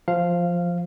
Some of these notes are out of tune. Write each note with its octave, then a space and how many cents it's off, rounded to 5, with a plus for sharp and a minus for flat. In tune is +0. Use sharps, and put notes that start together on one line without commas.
F3 +0 F5 -10